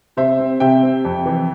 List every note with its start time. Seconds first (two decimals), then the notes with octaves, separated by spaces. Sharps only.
0.17 C3 C5 E5
0.40 C4
0.60 C3 E5 G5
0.83 C4
1.05 F2
1.26 E3